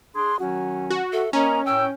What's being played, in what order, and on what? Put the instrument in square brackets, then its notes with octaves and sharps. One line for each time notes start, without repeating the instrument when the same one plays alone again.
[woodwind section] D4 G#4 [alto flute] C6
[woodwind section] D#3 F#3 C#4 [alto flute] F#4
[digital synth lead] F#4
[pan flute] A4 [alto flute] E5
[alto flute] A#3 [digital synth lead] C#4 [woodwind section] A#4 D#5 [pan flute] A#5
[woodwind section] A2 A#4 G5 [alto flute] C#5 [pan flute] E6